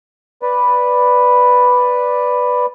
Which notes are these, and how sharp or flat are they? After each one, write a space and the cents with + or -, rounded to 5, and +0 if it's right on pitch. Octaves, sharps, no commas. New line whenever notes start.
B4 +0 D5 +0